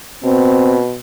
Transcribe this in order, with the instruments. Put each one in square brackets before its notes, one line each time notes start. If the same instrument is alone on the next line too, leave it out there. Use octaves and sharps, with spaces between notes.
[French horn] B2 [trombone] C4